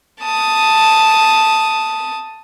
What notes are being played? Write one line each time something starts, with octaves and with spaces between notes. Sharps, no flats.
A5 D#6